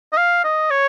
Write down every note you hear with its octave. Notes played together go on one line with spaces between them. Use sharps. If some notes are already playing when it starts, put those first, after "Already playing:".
D#5
F5
D#5
C#5